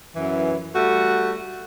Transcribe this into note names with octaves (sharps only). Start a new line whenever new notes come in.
F#2 E3
G3 A3 F#4